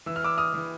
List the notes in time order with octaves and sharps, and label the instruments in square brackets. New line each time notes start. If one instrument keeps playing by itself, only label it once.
[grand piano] E3 E6
F6
D6 E6
D#6 F6
E3